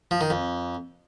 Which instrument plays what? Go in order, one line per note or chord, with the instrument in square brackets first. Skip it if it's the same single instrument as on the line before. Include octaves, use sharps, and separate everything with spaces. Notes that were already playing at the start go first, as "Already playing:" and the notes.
[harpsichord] F3
D#3
F2